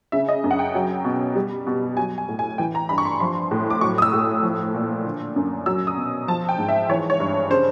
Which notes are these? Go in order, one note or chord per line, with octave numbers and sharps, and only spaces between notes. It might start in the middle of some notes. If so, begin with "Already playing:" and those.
C#3 E5
D#5
F#2
F#5
G5
F#3
B2
G3
B2
F#3 G#5
G#5
A2
G#5
E3 G5
A#5
G2 B5
C#6
C6
F3 C6
A2
D6
F#3 C#6
D#6
E6
A2
F3
A#2
D3
F#2
F#3 E6
D#6
B2
F3 A5
G5
G#2
E5
E3 C#5
C#5
G2
C#3 C5